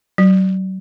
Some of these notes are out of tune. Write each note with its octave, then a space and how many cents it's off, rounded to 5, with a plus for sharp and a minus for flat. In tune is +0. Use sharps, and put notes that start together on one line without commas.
F#3 +35